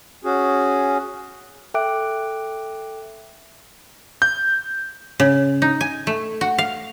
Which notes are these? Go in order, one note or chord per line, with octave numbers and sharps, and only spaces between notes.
C#4 F#4 G#4
A4 E5 G5 D6 F#6 D7
G6
C#3
D#4
G#5
A3
F#4
F5